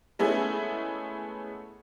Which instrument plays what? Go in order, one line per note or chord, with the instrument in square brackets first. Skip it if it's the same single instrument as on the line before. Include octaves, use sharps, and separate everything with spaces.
[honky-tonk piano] G#3 A3 B3 C#4 E4 G#4